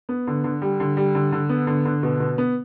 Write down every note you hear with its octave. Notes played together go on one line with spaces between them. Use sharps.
B3
D3
D3
G3
D3
G3
D3
D3
B3
D3
D3
B2
B2
B3